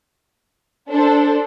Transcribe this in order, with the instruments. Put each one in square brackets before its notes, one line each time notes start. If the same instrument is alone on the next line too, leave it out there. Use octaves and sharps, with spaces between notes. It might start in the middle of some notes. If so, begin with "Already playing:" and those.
[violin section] D4 A4 C5